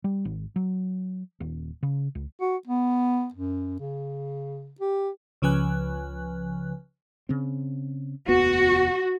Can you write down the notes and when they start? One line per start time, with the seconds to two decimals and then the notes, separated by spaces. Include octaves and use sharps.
0.04 G3
0.25 G#1
0.56 F#3
1.40 D#1
1.83 C#3
2.15 C#2
2.41 F#4
2.67 B3
3.33 F#2
3.80 C#3
4.80 G4
5.42 C#2 C#3 F3 B4 G#5 F#6
7.29 C#3 C4
8.28 F1 D#2 B3 F#4